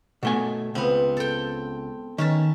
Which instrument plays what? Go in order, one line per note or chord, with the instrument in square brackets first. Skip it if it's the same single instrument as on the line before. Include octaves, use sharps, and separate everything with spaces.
[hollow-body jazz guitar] B2 A3 G#5
[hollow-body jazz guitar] C#2 [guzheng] B3 C4
[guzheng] A4 G5
[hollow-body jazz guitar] D#3 [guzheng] C#4 E5 A5